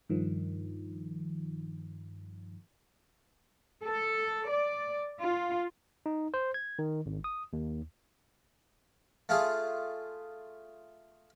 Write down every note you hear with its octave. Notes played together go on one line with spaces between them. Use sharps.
G2 D#3 F3
A4
D5
F4
D#4
C5
G#6
D#3
G#1
D#6
D#2
A3 F4 G#4